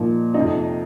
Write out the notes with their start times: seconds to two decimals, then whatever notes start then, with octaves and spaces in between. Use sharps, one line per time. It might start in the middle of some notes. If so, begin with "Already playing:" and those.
Already playing: A#2 F3 D#4
0.34 F2 C3 F3 D#4